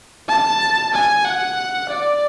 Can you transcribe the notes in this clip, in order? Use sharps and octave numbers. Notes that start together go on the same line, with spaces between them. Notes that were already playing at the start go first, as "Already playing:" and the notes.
A5
G#5
F#5
D5